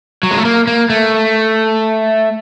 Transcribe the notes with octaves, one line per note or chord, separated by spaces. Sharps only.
F#3
G#3
A3
A#3
A#3
A3